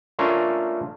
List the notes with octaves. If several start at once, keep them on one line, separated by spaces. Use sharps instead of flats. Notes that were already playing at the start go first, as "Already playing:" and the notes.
A3 C#4 D4 F4 A#4